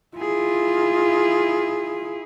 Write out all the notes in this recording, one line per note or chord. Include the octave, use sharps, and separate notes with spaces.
E4 F4 G#4